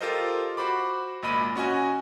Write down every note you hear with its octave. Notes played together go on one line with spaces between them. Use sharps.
F4 G4 A4 A#4 C5 D#5
F#4 C5 B5 D6
G#1 A#2 D#5 B5 D#7
C#4 F#4 D#5 G#5